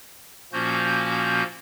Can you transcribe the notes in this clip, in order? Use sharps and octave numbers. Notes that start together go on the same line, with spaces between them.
A#2 F3 A#3 C#4 F#4 G6